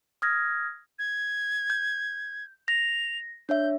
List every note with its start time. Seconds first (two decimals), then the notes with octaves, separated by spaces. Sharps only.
0.22 D#6 F6 G#6 A#6
0.99 G#6
1.70 G6
2.68 A#6 F7
3.49 D4 C#5 E5 G6